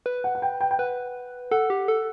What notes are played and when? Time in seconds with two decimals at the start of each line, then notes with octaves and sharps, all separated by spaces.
0.06 B4
0.24 F#5
0.35 F#5
0.42 G5
0.61 G5
0.71 G5
0.79 B4 F#5
1.51 A4 F#5
1.70 G4
1.88 A4